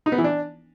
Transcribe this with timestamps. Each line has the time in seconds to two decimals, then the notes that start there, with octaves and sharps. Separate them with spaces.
0.06 D#4
0.12 B3
0.18 E3
0.24 D4